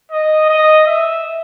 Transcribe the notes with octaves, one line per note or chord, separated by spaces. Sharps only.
D#5
D#5
E5